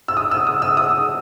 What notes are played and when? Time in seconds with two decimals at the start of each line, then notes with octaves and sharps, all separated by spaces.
0.08 E6
0.17 D#6
0.31 E6
0.47 D#6
0.62 E6
0.77 D#6